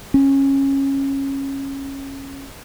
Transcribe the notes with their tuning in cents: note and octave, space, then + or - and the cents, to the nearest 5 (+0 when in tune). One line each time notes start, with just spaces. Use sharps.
C#4 -20